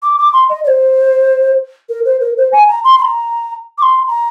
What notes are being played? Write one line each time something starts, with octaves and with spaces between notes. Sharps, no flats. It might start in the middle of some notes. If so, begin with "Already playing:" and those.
D6
D6
C6
D#5
D5
C5
A#4
C5
A#4
C5
G#5
A#5
C6
C6
A#5
D6
C6
A#5